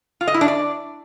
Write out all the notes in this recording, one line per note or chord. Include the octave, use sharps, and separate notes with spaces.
F4
D#5
E4
D4
D5